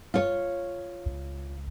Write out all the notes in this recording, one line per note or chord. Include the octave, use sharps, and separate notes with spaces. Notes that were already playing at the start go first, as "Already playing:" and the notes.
F4 C#5
C#2